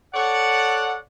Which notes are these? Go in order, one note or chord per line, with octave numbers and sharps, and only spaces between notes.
A4 C#5 D5 F#5